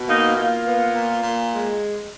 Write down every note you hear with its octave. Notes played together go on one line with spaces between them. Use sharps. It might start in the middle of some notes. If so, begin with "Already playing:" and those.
Already playing: B2
A#3 D#4
A#3 F4
B3
A#2
A#2
G#3